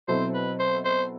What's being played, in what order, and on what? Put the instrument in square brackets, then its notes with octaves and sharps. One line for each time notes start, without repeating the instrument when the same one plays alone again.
[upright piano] B2 F#3 C4 E4 A4 [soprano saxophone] C5
[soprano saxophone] B4
C5
C5